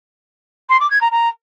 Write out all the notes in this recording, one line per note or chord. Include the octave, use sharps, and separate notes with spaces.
C6
D6
G#6
A#5
A#5